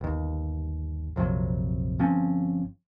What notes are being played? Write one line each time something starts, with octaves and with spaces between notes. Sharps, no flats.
G1 D#2
A#1 F2 C3 F#3
G1 F3 C4 C#4